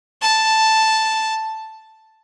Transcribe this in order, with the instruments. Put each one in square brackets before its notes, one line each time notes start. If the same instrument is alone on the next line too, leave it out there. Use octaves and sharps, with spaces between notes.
[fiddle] A5